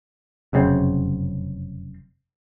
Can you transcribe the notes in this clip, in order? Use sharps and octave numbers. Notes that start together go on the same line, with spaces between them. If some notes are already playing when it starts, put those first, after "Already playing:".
F1 F#2 C#3 C4